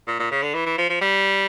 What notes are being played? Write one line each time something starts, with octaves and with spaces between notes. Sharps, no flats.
A#2
A#2
C#3
D3
E3
E3
F3
F3
G3